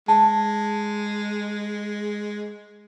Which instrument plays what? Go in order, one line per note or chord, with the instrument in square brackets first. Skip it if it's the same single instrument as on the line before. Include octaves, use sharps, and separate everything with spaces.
[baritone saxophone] G#3 [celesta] A5